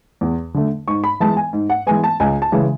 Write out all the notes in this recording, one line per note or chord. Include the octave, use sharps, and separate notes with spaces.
E2
D3 A3
G#2 C#6
B5
E3 G#3 B3 A5
G#5
G#2
F#5
E3 G#3 B3 G#5
A5
C#2 G#5
A5
C#3 E3 G#3